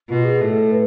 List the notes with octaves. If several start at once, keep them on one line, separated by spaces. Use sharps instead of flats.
B2 F4
G#4
A2 A4
B4